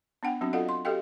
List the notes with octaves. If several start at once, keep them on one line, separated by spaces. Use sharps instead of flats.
B3 D4 F#5 G5
F#3 C4 D4 F#4
F4 A4 D5 D#5 F5 F#5
C6
F#4 G4 A4 D#5 F5 G5